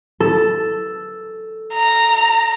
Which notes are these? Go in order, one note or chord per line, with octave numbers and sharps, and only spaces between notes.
A4
A#5